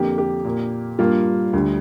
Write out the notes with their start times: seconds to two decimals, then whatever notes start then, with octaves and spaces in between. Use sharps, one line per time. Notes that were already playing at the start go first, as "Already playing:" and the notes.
Already playing: F2 D3 A#3 G4
0.18 G4
0.44 A#2 A#3
0.99 G2 G3 A#3 F4
1.53 D2 D3 G3